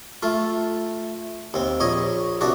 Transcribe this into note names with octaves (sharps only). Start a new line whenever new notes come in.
A3 F4
D#2 C4
A#1 C#5 D#5
C2 D4 F#4